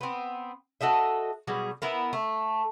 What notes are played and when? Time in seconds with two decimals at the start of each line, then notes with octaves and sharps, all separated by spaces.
0.01 B3 C4
0.81 F#4 A4 D#5 E5
1.47 B2 F#3 G3 G#4
1.82 B3 E4 A#4
2.13 A3